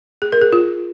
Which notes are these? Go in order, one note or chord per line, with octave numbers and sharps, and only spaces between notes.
G#4
A#4
G#4
F4